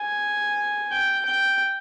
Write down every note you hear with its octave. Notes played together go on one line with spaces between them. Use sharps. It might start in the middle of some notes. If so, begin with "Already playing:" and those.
Already playing: G#5
G5
G5